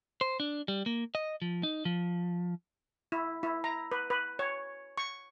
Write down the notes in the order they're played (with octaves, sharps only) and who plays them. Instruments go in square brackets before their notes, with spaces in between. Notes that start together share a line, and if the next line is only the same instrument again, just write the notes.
[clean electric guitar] C5
D4
G3
A#3
D#5
F3
D#4
F3
[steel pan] E4
E4
A#5
B4
B4
C#5
C#6